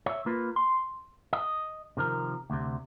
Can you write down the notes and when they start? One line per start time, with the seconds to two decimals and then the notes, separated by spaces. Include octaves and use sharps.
0.06 C#5 E5
0.26 A#3 F4 B4
0.56 C6
1.33 D#5
1.97 C3 D#3 F3 A#4
2.50 D2 C3